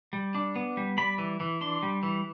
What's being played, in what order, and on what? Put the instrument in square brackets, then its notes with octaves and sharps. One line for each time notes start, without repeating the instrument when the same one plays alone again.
[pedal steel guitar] G3
D4
B3
G3
G3 B5
E3
E3
D4 C6
G3
E3